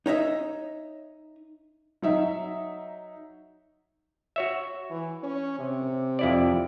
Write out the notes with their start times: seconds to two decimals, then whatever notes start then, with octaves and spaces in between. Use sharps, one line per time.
0.06 D#4 C#5 D#5 E5
2.02 F#3 D#4 E5
4.36 F#4 C#5 E5
4.90 E3
5.23 C#4
5.59 C3
6.19 F2 E4 D5